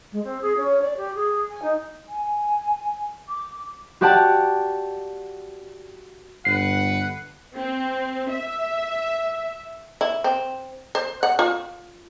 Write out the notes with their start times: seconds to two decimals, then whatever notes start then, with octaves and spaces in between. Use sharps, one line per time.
0.11 G#3
0.23 C4
0.41 G#4
0.56 C#4
0.81 D5
0.96 G4
1.14 G#4
1.50 G#5
1.62 D#4
2.09 G#5
3.29 D6
4.01 F#4 G4 D5 F#5 A5
6.45 G1 B4 F#5 C7
7.57 C4
8.30 E5
10.01 E4
10.24 C4
10.95 C5
11.23 F#5
11.39 F4